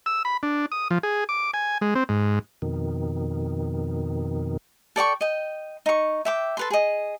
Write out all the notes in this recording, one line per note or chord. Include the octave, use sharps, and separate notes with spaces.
E6
B5
D4
D#6
F3
G#4
D6
G#5
G#3
C4
G#2
F2 B2 D#3
A4 D5 G5 C#6
D#5 G5
D#4 C#6
E5 G5 D6
A4 B4 C6
G#4 D#5